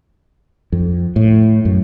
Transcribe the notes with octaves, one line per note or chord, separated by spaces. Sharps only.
F2
A2
F#2